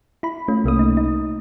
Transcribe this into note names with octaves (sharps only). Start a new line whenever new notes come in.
E4 B5
A3 C#4 F4
C2 C3 A3 A#3 C#4 D#6
D#4
D#4